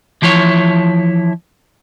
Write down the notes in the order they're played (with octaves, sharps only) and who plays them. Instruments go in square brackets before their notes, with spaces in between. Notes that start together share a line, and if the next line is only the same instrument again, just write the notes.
[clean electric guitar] E3 F3 E4 C#5